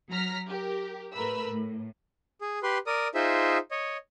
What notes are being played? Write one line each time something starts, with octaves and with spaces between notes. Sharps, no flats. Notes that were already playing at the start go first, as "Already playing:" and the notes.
F#3 A#5 F6 B6
G4 A#4
A2 A3 A#4 B4 B5 E6
A2
G#4
G4 B4 C6
A#4 D5 D#6
D#4 F4 G#4 C5 E5
C#5 D#5